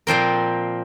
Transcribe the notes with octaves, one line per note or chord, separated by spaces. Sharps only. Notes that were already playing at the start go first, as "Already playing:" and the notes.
A#2 F3 C4 A#4